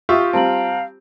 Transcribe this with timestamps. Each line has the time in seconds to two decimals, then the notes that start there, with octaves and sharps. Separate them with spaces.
0.09 F4 G4 E5 C#6 D#6
0.33 G3 C4 F5 A5 A#5 F#7